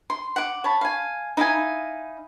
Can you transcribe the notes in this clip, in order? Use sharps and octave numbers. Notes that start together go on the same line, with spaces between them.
C6
F#5 D6
C#5 A5 B5
F5 G#5
D#4 E4 F5 G#5